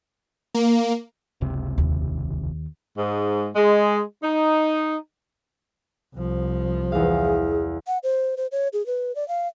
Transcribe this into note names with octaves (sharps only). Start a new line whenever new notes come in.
A#3
F#1 C#2 C3
D#2
G#2
G#3
D#4
C2 F3
E2 G#4 F5
F#5
C5
C5
C#5
G#4
B4
D5
F5